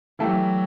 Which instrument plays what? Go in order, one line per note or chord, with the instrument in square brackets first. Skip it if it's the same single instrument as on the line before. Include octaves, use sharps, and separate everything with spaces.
[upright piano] E3 A3 E4 G4 [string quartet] F#3